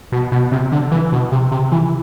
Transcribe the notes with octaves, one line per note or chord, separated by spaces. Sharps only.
B2
B2
C3
D3
E3
B2
C3
C3
E3